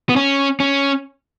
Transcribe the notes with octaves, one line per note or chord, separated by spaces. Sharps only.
B3
C#4
C#4